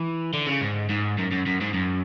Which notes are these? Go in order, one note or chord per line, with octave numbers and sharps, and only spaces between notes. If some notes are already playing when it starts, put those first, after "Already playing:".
Already playing: E3
D3
C#3
G#2
G#2
F#2
F#2
F#2
G#2
F#2